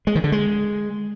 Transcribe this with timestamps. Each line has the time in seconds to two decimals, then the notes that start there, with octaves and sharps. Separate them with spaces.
0.07 G#3
0.15 D#3
0.24 D3
0.32 G#3